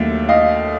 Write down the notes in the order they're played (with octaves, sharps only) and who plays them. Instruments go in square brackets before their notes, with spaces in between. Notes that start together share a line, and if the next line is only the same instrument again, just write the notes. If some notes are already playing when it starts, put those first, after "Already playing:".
Already playing: [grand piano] D#2 D3 F#3 A3 [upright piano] E5
[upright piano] D#5 F5